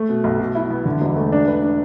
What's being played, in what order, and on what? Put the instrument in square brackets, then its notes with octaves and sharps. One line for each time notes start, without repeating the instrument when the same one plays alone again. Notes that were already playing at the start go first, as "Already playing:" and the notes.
Already playing: [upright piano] A3
B2
B1
B2
E4
B3
D3
E1
A3
D4
B4
D4